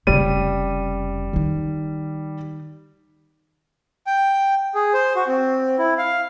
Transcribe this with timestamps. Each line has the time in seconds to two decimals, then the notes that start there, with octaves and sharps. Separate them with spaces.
0.07 F1 C#3 G3 D#7
1.33 D#3 D#4
4.07 G5
4.75 G#4
4.94 C5
5.16 F#4
5.27 C4
5.79 E4
5.98 F5